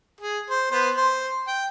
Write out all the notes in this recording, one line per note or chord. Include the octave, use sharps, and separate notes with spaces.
G#4
C5
B3 C5
C5
G5